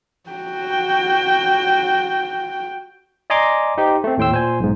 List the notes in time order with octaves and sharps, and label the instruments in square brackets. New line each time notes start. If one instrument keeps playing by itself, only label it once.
[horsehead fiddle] F#4 G5
[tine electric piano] D5 D#5 G#5 A#5 C6 D6
D#4 G4 C5
A3 C4
D#2 A2 G5 C6 E6
A#2 C5 G#5
B1 G#2